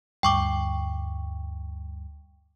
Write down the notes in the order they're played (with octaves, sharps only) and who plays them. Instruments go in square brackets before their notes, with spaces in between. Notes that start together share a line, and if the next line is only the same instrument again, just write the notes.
[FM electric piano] D2 G2 [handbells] G5 C#6 D6